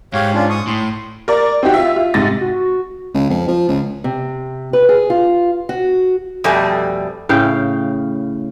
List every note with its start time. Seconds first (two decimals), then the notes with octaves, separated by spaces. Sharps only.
0.13 G#2 G4 C#5 F5
0.34 C#4 D4 F4
0.50 C#6 D#6
0.67 A2 C6
1.28 A#4 D5
1.63 C4 D#4 F#4 G4
1.74 F4 E5
1.96 F4
2.14 G#2 C3 A6 A#6
2.41 F#4
3.14 C#2
3.30 F2
3.48 F3
3.69 C#2
4.04 C3
4.73 B4
4.89 G#4
5.10 F4
5.69 F#4
6.44 F2 B2 G3 A3 G#5
7.29 A2 C#3 F5 G5